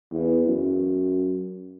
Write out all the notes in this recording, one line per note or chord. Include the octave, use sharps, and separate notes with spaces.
E2
F#2